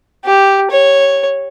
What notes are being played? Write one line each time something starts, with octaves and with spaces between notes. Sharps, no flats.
G4
C#5